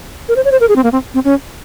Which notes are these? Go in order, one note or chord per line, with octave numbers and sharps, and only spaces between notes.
A#4
C5
C#5
C5
A#4
G#4
C4
A#3
C4
C4
C#4